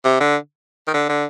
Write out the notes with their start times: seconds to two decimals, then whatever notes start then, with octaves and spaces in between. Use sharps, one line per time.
0.05 C3
0.20 D3
0.87 D#3
0.94 D3
1.09 D3